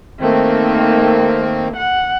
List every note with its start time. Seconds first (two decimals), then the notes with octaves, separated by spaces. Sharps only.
0.20 D#3 A3 A#3 C4
1.77 F#5